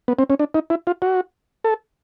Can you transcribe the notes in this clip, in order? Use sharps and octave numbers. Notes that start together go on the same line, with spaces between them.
B3
C4
C#4
D4
D#4
E4
F4
F#4
A4